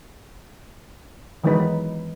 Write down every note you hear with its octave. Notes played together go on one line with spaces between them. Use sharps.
D#3 E3 F#3 G#3 D#4 B4